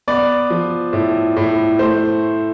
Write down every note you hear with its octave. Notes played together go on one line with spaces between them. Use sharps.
B3 D5
F3
A2
A2
A3 C5